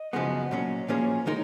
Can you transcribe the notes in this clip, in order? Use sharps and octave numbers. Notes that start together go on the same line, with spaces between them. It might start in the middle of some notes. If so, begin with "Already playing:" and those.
Already playing: D#5
F#2 C#3 F3 G#3 B3
A#2 F#3 C#4 C#5
A#2 F3 A#3 C#4 G#4
D#3 G#3 D#4 A#4 D#5